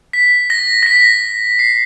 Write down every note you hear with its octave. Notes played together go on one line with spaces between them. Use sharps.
B6
A#6
A#6
B6
C7